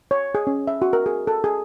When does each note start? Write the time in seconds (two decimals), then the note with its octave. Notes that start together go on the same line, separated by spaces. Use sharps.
0.11 C#5
0.35 G#4
0.47 C#4
0.68 E5
0.82 F#4
0.93 A#4
1.06 G#4
1.27 A4
1.44 G#4